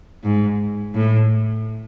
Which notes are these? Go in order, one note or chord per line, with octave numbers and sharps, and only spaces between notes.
G#2
A2